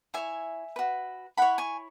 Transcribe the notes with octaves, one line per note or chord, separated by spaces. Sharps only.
E4 C#5 E5 G#5
F#4 B4
E4 C#5 F#5 B5
G#5 C#6